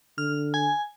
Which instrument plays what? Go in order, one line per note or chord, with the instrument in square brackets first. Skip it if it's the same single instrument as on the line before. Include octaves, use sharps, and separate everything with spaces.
[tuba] D3 [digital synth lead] F6
[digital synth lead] G#5